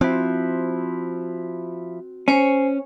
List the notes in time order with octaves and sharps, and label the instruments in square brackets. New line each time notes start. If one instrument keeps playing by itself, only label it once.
[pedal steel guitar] F3 E4 [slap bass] C4 [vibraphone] F#4
[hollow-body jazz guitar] C#4 [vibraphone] C5 C#5 G#5